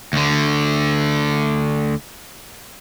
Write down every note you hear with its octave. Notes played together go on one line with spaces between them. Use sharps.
D2 D3